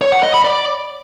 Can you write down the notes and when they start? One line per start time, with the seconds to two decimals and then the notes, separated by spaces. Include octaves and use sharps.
0.01 C#5
0.12 F#5
0.23 D#5
0.34 B5
0.44 D5